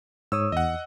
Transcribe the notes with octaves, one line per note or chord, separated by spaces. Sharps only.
G#2 C#5 D#6 E6
E2 D#5 F#5